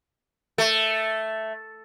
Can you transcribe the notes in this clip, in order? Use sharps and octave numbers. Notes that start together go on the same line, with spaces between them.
A3